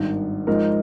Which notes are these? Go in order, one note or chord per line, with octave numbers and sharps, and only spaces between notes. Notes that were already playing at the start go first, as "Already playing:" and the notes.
Already playing: G#1 G2 D#3
G#2 F3 G#3 D#4 A#4